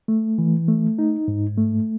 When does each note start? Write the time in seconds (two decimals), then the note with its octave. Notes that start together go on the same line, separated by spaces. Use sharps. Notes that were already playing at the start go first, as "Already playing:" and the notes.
0.08 A3
0.38 E3
0.68 A3
0.98 D#4
1.28 G#2
1.57 A3